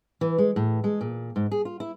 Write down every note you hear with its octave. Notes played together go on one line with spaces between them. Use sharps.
E3
G#3
A2
G#3
A#2
G#2
G#4
F4
E4